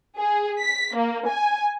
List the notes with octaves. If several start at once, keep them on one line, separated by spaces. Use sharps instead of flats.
G#4
B6
A#3
G#5